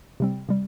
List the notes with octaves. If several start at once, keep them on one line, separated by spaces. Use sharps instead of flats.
C3 G3 C4
C3 G3